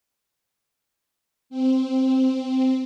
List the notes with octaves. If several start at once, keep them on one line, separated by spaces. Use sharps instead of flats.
C4